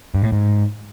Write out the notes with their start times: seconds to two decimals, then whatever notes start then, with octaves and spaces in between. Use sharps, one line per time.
0.15 G2
0.23 A2
0.32 G#2